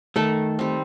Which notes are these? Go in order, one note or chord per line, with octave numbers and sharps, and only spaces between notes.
D#3 A3 A4
G3 C4